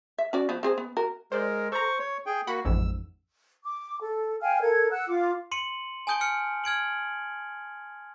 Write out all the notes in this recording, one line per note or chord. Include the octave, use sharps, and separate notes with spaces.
E5
C#4 F#4 D5
F3 B3
C4 G#4 C5
B3
F#4 A#4
G#3 A#4 C5 D5
A4 C5 A#5 C#6
C#5
G#4 G5
A#3 F#4 F#5 B5
A1 F2 G#2 E6
D6
A4
F5 G5 G#5 F6
A4 A#4 G#6
F#5 E6 F#6
F4 D6
C6 C#7 D#7 F#7
G#5 A5 D#6 G6 D7 G7
F6 C#7
F6 G#6 D7 F#7